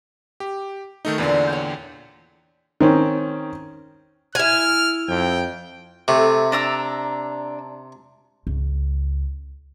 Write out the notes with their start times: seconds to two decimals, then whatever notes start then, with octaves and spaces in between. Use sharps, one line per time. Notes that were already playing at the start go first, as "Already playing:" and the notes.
0.40 G4
1.05 D#3 A3 D#4
1.18 E2 A#2 D3 B4 D5
1.49 C#5 G5
2.80 D#3 C4 C#4
4.35 E4 G#5 F6
5.08 F2 G5
6.08 C3 A3
6.52 D4 A#5 E6
8.47 C#2